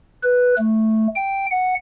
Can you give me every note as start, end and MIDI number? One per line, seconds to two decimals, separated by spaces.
0.23 0.54 71
0.58 1.07 57
1.16 1.46 79
1.51 1.74 78